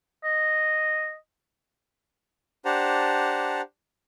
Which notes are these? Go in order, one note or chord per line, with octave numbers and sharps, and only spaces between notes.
D#5
D4 G4 C5 F#5 A5 A#5